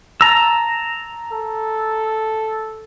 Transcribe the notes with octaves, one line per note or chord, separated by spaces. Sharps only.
A5 A#5 E6
A4